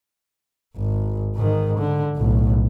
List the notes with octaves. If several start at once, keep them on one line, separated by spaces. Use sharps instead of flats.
G#1
G#2 D#3
D3
B1 A2